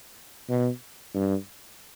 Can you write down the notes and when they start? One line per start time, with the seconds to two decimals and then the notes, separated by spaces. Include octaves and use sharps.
0.49 B2
1.15 G2